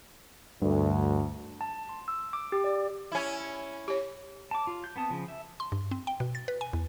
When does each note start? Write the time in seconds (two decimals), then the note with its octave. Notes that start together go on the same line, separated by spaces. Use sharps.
0.62 D2 G2
1.61 A5
1.89 C6
2.08 E6
2.33 D6
2.52 G4
2.64 D5
3.12 C#4 E4
3.88 G4 C#5
4.51 A5 D6
4.67 F4
4.84 G6
4.96 B3 C4 A5 D#6
5.10 C#3 F3
5.28 E5
5.60 C6
5.72 G2
5.91 C4
6.07 G5
6.20 B2
6.35 A6
6.48 B4
6.61 G#5
6.73 E2